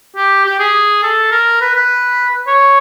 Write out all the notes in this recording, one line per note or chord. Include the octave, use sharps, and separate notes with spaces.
G4
G4
G#4
A4
A#4
B4
B4
C#5